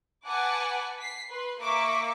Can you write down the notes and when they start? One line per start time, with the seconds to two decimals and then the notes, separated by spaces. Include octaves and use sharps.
0.25 B4 F#5 G#5 A5 D6
0.99 B6 C7
1.31 B4 C6
1.60 A#3 E5 C#6 D6